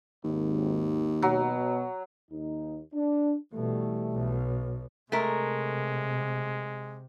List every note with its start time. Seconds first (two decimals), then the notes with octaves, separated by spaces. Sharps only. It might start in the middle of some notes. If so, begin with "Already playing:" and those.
0.24 G#1 D#2
1.22 B2 F#3
2.31 D#2 D#4
2.93 D4
3.53 B2 E3 G3 A3
4.11 B1
5.12 C3 G#3 A3 A#4